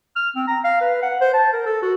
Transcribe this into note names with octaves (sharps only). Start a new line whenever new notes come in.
F6
C4
A#5
F5
B4
F#5
C5
A5
A#4
A4
F#4